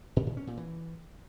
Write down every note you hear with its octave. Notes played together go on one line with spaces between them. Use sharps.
A#2
A#2
C#4
A#2
E3